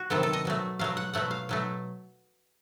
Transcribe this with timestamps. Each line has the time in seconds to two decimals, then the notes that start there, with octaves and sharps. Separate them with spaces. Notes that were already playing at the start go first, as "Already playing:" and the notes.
Already playing: F#4
0.10 C3 D#3 F#3 B3 A4
0.23 A4
0.33 D#5
0.45 B2 F#3 A3
0.79 B2 F#3 A3 F5
0.97 F#5
1.13 B2 F#3 A3 F#5
1.31 F5
1.49 B2 F#3 A3